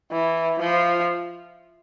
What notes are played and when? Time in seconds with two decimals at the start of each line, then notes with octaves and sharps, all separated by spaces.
0.12 E3
0.60 F3